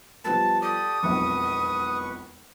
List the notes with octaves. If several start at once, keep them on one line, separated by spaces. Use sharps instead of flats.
F3 G3 B3 A5
G4 A4 D5 D#6
E1 B1 F2 B4 C#6